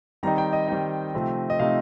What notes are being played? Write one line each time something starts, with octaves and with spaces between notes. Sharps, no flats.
D#3 G3 C4 D#4 A#5
G5
D#5
D#3 G3 C4 D#4
C3 F3 A3 C4 D#4
D#5
C3 F3 A3 C4 D#4 F5